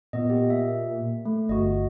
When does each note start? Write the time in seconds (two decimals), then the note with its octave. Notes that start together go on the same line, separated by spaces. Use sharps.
0.13 A#2 B3 D#5
0.30 G4
0.50 E5
1.25 A3
1.49 G1 F#4 D#5